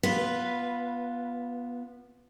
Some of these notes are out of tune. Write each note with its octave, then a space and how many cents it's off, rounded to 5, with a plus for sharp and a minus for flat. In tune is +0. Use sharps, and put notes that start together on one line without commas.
B3 -20 F4 +0 B4 +0